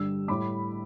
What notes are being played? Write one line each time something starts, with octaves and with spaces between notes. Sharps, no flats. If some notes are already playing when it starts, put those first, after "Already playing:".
Already playing: G2 D3 G3 E6
A2 G3 B5 D6